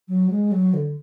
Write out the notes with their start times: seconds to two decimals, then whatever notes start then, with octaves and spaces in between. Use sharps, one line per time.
0.08 F#3
0.30 G#3
0.52 F#3
0.74 D3